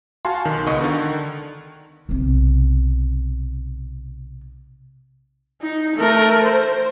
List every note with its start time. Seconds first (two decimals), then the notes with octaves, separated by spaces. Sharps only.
0.25 F#4 F5 G#5 A5 C6
0.45 B1 D#3
0.66 C#2 B3 D#5 C#6
0.81 D3 D#3
2.09 B1 C3
5.62 D#4
5.96 A3 A#4
6.43 C5